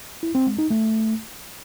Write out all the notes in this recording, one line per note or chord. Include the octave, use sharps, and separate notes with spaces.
E4
C4
G#3
D#4
A3